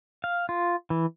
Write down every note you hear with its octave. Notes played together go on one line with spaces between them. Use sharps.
F5
F4
E3